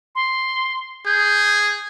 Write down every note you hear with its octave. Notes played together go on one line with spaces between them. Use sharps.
C6
G#4 G6